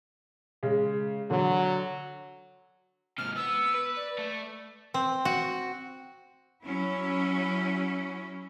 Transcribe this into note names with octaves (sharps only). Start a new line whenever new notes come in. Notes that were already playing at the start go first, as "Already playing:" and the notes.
C#3 G#3
D3 F#3
G#2 C3 F6
B3 E6
B4
D5
A3
C4
F#4
F#3 C#4 E4